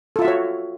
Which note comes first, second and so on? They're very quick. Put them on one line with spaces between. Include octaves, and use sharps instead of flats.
A4 F4 E5 F#4 C#5